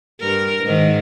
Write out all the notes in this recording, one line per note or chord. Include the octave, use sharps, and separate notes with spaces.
G2 A#4
G#2 D#3